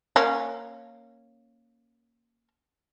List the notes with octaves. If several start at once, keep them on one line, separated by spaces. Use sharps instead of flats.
A#3 C#4